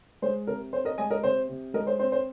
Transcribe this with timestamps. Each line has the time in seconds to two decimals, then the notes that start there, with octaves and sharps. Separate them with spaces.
0.22 G#3 C5
0.47 C3 A#4
0.73 C4 C5
0.85 A#4 D#5
0.98 G#3 D#5 G#5
1.10 A#4 D#5
1.23 C3 C5
1.49 C3
1.73 G#3 A#4 D#5
1.87 C5
1.99 C4 C5
2.12 C5